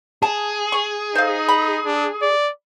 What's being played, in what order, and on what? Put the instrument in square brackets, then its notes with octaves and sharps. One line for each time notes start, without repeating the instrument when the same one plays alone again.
[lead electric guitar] G#4 [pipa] A5
[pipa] C#6
[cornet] D#4 [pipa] C5 F5
[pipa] B5
[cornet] D4
D5